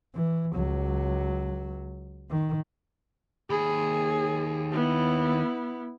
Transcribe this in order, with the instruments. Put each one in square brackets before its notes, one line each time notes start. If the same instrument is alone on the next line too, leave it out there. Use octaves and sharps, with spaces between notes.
[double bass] E3
C#2 F#3
D#3
[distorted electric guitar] D#2 B5 [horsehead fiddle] G#4
[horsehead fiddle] B3 E4